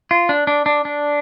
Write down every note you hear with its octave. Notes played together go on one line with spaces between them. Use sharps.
F4
D4
D4
D4
D4